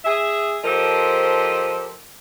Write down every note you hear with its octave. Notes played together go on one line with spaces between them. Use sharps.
G#4 E5
F3 G4 A4 A#4 C5 D#5